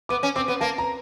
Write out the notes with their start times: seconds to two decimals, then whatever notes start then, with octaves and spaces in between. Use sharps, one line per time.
0.09 B3 D6
0.23 C#4
0.36 C4 D6
0.48 B3
0.60 A#3 A5
0.78 A#5